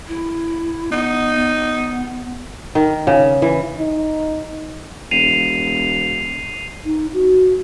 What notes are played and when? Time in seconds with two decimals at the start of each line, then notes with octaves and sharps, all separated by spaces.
0.08 E4
0.92 B3 D#4
1.35 B3
2.75 D#3
3.07 C#3
3.42 E3
3.78 D#4
5.11 E1 C7 D#7 F7
6.84 D#4
7.13 F#4